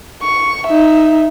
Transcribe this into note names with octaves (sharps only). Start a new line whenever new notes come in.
C#6
D#4 E5